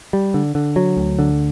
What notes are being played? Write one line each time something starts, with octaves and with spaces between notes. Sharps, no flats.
G3
D3
D3
F#3
D2
D3